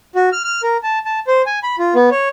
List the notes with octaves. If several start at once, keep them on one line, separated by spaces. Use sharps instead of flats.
F#4
F6
F6
A#4
A5
A5
C5
G#5
B5
F4
B3
C#5